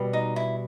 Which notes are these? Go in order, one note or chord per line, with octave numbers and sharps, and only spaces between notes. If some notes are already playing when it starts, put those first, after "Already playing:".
Already playing: B2 G3 B3
D#4
E4